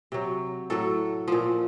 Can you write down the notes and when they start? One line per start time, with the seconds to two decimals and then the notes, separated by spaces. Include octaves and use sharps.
0.12 C3 F#3
0.70 A2 F#3 A4
1.28 A#2 F3